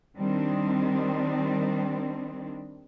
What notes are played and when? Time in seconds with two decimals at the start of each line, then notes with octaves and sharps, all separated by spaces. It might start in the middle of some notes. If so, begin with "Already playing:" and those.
0.16 D#3 G3 C4 D4